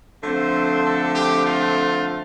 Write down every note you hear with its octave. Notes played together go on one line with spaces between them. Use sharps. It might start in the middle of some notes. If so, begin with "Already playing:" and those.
D3 F3 A3 C4 C5
A4
G4
F4